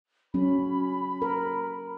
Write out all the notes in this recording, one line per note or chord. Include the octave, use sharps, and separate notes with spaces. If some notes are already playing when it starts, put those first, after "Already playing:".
F#3 C#4 B5
A#4